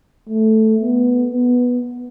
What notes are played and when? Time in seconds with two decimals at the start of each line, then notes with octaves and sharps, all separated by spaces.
0.29 A3
0.81 B3
1.33 B3